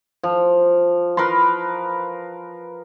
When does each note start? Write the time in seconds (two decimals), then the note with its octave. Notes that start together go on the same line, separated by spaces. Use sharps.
0.23 F3
1.17 A#4 B4 B5 C6